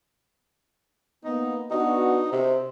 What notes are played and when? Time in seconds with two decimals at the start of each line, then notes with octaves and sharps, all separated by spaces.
1.24 A#3 B3 D#4
1.70 B3 D4 D#4 F#4
2.32 C3 C5